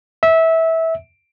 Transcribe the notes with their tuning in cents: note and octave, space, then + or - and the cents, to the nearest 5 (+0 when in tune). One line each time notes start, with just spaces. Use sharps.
E5 -20